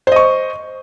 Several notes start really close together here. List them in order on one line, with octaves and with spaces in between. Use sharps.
C5 D#5 C#6